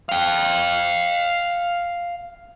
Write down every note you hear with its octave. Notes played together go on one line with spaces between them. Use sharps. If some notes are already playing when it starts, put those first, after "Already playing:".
F5 G5